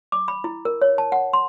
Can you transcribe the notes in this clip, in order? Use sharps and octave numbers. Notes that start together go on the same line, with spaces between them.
D6
B5
E4
A#4
C#5
A5
F#5
C6